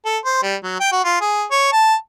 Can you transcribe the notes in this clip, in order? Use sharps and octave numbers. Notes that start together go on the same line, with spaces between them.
A4
C5
G3
F#3
G5
F#4
F4
G#4
C#5
A5